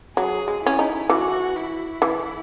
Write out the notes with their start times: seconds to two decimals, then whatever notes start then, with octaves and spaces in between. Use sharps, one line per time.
0.17 F#3 G#4
0.48 G#3
0.64 C#4 E4
0.79 D#4
1.10 E3 F#4
1.56 E4
2.02 E3